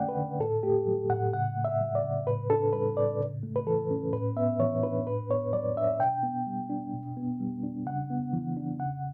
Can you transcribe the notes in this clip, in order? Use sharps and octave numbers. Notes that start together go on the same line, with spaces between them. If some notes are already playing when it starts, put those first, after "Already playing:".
Already playing: D3 A3 C#4 D5 F#5 G5
B4
D3
A2 A4
A3 G4
F#3
A2 F#5
C#3 F#5
A3
E5
F#3
D5
C#3
A2 B4
D4 A4
G3 B4
A2 D5
C#3
A3
B4
E3 A4
C#4
A2 B4
B3 E5
E3 C#5
D4 B4
A2 B4
B3 C#5
F#3 D5
D4 E5
B2 G5
B3
G3
D4
B2
B3
G3
D4
C#3 F#5
B3
E3
D4
C#3 F#5